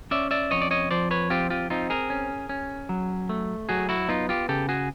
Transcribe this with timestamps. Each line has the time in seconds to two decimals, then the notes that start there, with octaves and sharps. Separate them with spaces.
0.11 C#4 D5 E5
0.31 D5 E5
0.51 F2 C#5 D#5
0.62 D5
0.71 C#5 D#5
0.91 F3 C5 D5
1.11 B4 C#5
1.30 C4 F4 G4
1.50 F4 G4
1.70 C4 D#4 F4
1.90 G#4 A#4
2.10 C#4
2.49 C#4
2.89 F#3
3.29 A3
3.69 F#3 F#4 G#4
3.89 E4 F#4
4.09 B3 D#4 F4
4.29 F4 G4
4.49 C#3 G4 A4
4.69 F#4 G#4